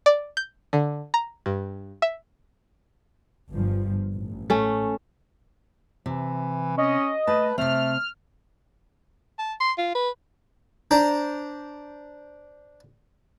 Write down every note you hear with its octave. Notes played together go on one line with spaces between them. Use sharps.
D5
G6
D3
A#5
G2
E5
G1 G2 F3
A1
A3 C#4
C3 E3
C#4 D#5
A3 B4 A5
C3 A3 C4 F6
A5
C6
F4
B4
D4 C5 A#5